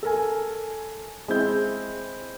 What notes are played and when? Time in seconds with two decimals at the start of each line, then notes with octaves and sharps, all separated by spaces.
0.03 A4 A#4 G#5
1.28 G#3 C4 E4 G6